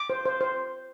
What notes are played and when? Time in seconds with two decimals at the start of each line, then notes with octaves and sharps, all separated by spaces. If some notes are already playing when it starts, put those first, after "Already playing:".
Already playing: D6
0.10 C5
0.25 C5
0.41 C5